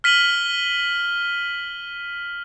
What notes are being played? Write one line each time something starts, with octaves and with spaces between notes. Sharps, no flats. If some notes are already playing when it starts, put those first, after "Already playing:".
F6 B6 D#7 F#7 G7